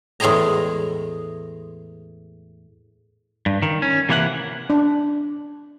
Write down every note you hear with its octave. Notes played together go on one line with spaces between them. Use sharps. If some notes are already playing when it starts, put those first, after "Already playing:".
E2 A2 G#3 G#4 D#5 A#5
G2
D#3
C#4
C3 E3 A#3 E4 C#5 F#5
D4